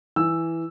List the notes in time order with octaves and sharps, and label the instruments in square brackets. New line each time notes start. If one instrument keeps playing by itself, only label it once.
[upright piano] E3 E6